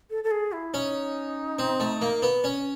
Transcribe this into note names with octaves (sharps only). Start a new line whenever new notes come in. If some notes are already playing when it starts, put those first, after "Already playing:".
A4
A4
G#4
E4
C#4 D#4
C4
A3
A#3
B3
C#4